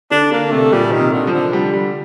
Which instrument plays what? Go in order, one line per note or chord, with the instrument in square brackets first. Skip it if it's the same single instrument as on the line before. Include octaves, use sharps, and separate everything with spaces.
[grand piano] D3 [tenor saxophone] D4
[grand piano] D3 [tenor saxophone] A#3
[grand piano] C3 [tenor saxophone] A3
[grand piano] A#2 [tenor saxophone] G3
[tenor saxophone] D#3
[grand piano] C3
[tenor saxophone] D3
[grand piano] F3
[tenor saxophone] D3
[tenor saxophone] D3 [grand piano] G3
[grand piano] G3